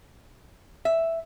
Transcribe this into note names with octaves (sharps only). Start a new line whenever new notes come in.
E5